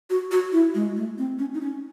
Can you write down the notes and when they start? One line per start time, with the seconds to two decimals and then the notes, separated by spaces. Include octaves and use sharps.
0.10 F#4
0.31 F#4
0.52 E4
0.75 G#3
0.96 A3
1.18 C4
1.39 C#4
1.54 D#4
1.61 C#4